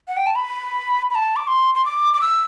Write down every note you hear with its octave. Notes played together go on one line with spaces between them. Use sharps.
F#5
G5
A5
B5
B5
A5
D6
C6
C6
D6
D6
E6